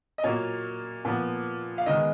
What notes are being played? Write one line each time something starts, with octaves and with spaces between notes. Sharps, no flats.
D#5
A#2 F#3 A#3 C#5
A#2 F3 B3
F5
D#3 G#3 B3 D#5